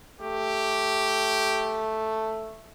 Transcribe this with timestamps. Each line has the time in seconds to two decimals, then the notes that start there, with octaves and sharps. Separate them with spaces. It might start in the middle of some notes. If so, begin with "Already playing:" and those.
0.21 A3 G4